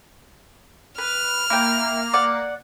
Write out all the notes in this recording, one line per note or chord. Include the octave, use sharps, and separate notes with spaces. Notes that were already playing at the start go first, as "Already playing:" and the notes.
B4 F6
A#3 E4 G5
D5 F#5